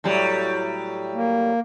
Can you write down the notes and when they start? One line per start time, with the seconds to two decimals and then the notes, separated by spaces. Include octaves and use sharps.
0.04 A2 F#3 G3
1.15 A#3